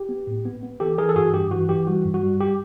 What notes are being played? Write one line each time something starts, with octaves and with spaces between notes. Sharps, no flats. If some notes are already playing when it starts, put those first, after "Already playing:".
Already playing: G4
B3
A2
B3
B3
E3 G4 A4
E3 G#4 A#4
A4
G2 F#4 G#4
G2 G4
E3 F#4
E3 G4
G3 F#4
G2
F#4
G3
G4